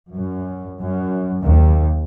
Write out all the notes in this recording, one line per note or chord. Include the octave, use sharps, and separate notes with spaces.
F#2
F#2
D#2